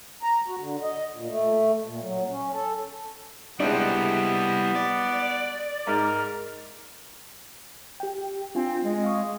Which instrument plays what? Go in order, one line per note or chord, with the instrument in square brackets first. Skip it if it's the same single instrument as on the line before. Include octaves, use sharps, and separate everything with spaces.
[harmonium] A#5
F#4
D3
D#5
A#2
A3
A#2
F#3
C#4
A4
[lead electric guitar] G3 E4 [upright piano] G#3 C4 D4 [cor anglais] B3
[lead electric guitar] D5
[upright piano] G#2 [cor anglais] A#4
[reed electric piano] G4 G5
[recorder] C4 [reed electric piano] D4 F4 G#5
[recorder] G#3
[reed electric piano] F5 C#6 D#6